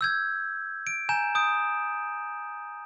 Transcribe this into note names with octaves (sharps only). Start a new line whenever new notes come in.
E6 G6 G#6
D7
G#5 A#5 G6 E7
D#6 G6 D7